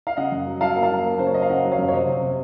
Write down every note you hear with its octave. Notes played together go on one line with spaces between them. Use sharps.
F5
C#3 D#5 F#5
F#2
F#3
F#3 F5 A5
A#3
F5 A5
F#3
A#3
C#3 C5
C#5
A#3 D#5
F5
C#3 D#5 F#5
F#3
C#5 F5
F#2
C#5
C3 C5 D#5
C3
C3